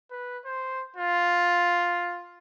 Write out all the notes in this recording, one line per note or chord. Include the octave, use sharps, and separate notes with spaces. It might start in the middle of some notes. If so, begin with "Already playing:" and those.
B4
C5
F4